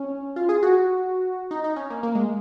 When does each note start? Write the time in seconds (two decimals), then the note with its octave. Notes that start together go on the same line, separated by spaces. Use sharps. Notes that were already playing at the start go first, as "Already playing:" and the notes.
Already playing: C#4
0.36 F4
0.49 G#4
0.63 F#4
1.51 D#4
1.64 D#4
1.76 C#4
1.90 A#3
2.03 A#3
2.15 G#3